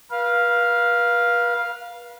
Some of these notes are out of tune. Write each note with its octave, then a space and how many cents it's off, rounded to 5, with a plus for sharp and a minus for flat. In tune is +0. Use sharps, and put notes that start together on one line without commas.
B4 -40 F5 +0